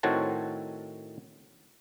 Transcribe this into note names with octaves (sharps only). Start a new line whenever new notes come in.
A2 D#3 C4 F#4 C#5 A5